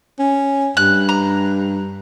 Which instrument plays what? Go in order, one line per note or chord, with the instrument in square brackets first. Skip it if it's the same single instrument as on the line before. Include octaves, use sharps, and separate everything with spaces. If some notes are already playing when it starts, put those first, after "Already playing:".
[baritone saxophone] C#4
[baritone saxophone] G2 [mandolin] F#6
[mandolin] A#5